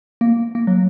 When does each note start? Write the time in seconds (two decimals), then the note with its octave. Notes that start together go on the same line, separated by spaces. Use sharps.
0.21 A#3
0.55 A#3
0.67 F#3